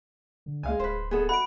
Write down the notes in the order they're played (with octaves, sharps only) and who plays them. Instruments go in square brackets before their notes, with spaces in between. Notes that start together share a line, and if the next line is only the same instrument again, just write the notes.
[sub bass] D3
[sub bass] C#2 [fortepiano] G#3 F5 G#5
[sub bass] D1 [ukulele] B4 C5
[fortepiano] B3 [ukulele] G#4 A4
[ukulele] F#4 [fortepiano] F#5 [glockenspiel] B5 D7